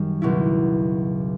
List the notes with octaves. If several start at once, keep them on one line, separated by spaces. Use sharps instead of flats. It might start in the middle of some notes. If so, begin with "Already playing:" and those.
Already playing: F#2 D#3 G3
C#2 B2 F#3 B3 E4